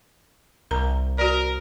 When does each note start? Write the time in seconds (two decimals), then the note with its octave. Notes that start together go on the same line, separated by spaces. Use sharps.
0.71 C2 A#4 A#5
1.18 F#4 A#4 D5